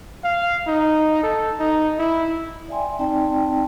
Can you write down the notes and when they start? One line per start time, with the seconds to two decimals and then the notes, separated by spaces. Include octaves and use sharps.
0.24 F5
0.67 D#4
1.23 A4
1.60 D#4
1.99 E4
2.69 D5 E5 G5 G#5 C6
2.99 C4 D#4 D5 G5 A5 C6